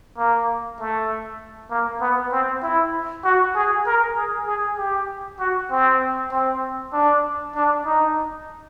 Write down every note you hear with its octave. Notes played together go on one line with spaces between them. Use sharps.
A#3
A3
A#3
B3
C4
E4
F#4
G#4
A#4
G#4
G#4
G4
F#4
C4
C4
D4
D4
D#4